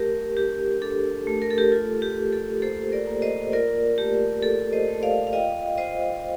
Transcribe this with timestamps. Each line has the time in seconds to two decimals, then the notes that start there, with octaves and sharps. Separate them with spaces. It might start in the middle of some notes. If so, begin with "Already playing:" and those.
Already playing: A3 G4 A#4
0.37 D4 G4
0.82 D4 A4
1.27 A3
1.42 A#4
1.51 A4
1.58 G4 A#4
1.72 F4 A4
2.02 G4
2.18 F4
2.32 A4
2.62 A#3 A4 C5
2.92 A#4 D5
3.07 A#3
3.22 C5 D#5
3.52 F4 A#4 D5
3.98 A3 G4
4.43 A3 A4
4.73 C5 D#5
4.88 A3
5.03 D5 F5
5.27 F5
5.33 F4 D#5 G5
5.77 F4 C5 D#5